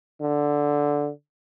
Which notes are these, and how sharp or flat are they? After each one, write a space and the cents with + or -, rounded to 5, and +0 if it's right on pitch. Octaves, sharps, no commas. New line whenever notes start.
D3 -5